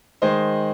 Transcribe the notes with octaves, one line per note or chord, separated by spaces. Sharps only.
D#3 G#3 C5 D#5